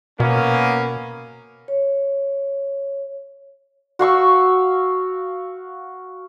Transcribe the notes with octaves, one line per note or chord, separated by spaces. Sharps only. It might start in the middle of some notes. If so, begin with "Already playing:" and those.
B2 A#3 B3 C#4
C#5
F#4 F5 C#6 E6